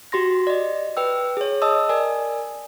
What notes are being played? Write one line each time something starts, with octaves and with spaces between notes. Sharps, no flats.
F#4 G4 C6 A#6
D5 D#5
B4 G5 E6
G#4 C#5
D#5 A5 D#6 E6
A#4 D5 G#5